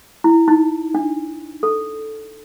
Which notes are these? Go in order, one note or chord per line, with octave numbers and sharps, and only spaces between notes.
E4
D#4
D4
A4